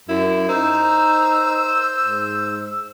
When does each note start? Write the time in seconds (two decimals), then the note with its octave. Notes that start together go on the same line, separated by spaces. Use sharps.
0.09 F#2 E4
0.49 D#4 C5 E6
2.03 G#2